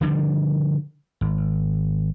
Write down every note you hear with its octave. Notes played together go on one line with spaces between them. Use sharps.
D3 D#3 F3 G3
G#1